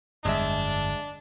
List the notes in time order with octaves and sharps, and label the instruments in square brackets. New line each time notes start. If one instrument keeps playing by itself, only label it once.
[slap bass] G1 F2 [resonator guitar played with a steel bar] G#3 G#4 E5 [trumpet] D4